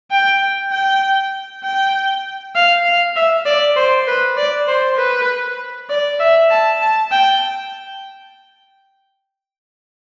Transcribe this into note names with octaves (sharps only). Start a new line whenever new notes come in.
G5
G5
G5
F5
F5
E5
D5
C5
B4
D5
C5
B4
D5
E5
A5
A5
G5